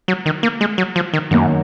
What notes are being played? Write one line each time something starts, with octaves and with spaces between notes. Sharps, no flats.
F#3
D#3
A#3
G#3
F#3
F3
D#3
F#2 D#3 F#3 A#3